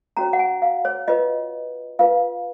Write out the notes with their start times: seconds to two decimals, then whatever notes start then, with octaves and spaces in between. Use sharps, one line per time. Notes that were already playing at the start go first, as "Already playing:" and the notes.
0.17 C#4 F#4 C#5 A#5
0.33 F#5
0.39 G#5
0.62 F5
0.85 C#5
1.08 F4 B4 D#5
1.99 F4 B4 F5